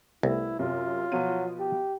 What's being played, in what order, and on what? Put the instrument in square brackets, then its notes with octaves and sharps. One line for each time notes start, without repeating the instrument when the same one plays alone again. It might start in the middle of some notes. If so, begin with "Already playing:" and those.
[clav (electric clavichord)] C2 [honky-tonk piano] A3 B3 [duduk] E4
[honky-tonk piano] F#2 C3 [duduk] F4
[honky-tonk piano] B2 F3 D#7 [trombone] F#3
[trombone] G4